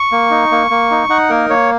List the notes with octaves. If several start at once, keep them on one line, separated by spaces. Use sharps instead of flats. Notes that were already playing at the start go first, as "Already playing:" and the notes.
Already playing: C#6
A#3
D#4
A#3
A#3
D#4
D#4 F#5
A#3 A#4
A#3 C#5